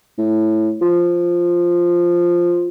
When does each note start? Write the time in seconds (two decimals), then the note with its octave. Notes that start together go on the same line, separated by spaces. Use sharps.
0.18 A2
0.81 F3